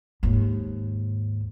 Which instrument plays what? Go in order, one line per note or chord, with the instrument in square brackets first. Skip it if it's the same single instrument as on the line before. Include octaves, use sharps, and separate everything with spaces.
[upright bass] D#2 G#2